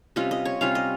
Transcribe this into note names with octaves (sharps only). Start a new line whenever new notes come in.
C3 G3 C#4 F4 D#5
D#5
C#5
C3 G3 C#4 F4 F5
D#5